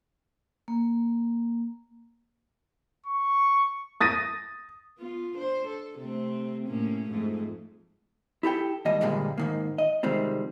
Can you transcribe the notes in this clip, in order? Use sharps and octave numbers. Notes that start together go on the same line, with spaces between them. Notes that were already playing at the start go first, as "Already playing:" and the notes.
A#3
C#6
D#6 A6 A#6 D#7
B3 F4
D4 C5
A4
C3 A3 C4
A2 A#3 C#4
F2 G#2 A3
E4 G4 A4 G5
D#2 G#2 G3 D#5
G2 A#2 D3 F3 G3 G#3
G#2 D#3 A#3
D#5
C3 D#3 F3 G3 G#3 C4